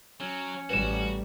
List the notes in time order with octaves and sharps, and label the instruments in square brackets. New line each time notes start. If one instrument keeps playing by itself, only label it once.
[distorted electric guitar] F#3 [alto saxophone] C#4
[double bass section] A1 G3 [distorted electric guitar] F#4 [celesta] B4 E7